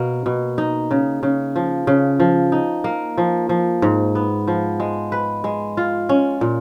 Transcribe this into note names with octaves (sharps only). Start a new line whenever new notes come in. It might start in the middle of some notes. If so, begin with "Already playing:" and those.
Already playing: B2 A#3
B2
D#4
C#3
C#3
F3
C#3
F3
D#4
A#3
F3
F3
G#2
B3
F3
G#3
B4
G#3
F4
C#4
A#2